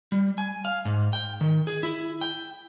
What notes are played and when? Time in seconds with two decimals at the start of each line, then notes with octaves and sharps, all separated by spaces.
0.12 G3
0.38 G#5
0.65 F5
0.85 G#2
1.13 G5
1.41 D#3
1.67 G#4
1.83 E4
2.21 G5